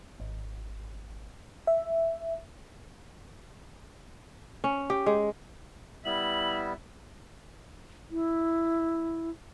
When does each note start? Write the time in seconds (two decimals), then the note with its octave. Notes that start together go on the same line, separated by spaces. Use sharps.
0.20 G#1
1.67 E5
4.64 C#4
4.90 G4
5.06 G#3
6.05 G3 B3 E4 E5 F#7
8.11 E4